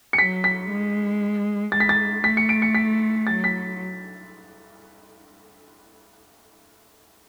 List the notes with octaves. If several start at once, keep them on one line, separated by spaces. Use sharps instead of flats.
C#7
F#3 B6
B6
G#3
G#3 A6
B6
A6
A3 B6
C#7
D7
C#7
B6
F#3 A6
B6